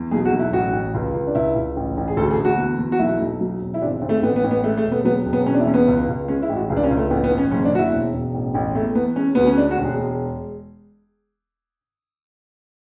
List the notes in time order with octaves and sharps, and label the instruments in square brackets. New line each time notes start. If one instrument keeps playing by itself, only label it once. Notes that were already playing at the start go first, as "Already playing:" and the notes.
Already playing: [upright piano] E2
B1 G#4
F#4
B1
E4
A1 F#4
A1
C#2
C#2
D4
C#2 E4
C#2
A1
A1
G#4
D2 A4
G#4
D2
F#4
E2
E2
F#4
B1 E4
B1
F#3
E1
E4
G#1 D4
G#1
A3
A1 B3
B3
A1
B3
G#3 A3
A3
E1
B3
F#3 B3
E1
B3
E2 C#4
D4
E4
E2 C#4
B3
C#2
C#2
G#3 C#4
E4
A1
F#4
C#2 G#4
D4
C#4
C#2
A3
A1 B3
B3
A1
C#4
F#1 C#4
D4
F#1 F#4
E4
E1
E1
A1
A1
E2 A3
E2 B3
G#3 C#4
D2 B3
C#4
G#3 D4
F#4
E1
G#4
G#3